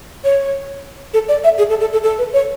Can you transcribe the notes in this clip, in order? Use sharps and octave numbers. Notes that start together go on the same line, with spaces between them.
C#5
A4
D5
E5
G#4
A4
A4
A4
A4
B4
C#5